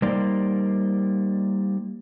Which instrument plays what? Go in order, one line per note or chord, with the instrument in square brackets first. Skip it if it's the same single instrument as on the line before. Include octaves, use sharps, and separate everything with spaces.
[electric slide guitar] G3 A#3 D#4 C5 D5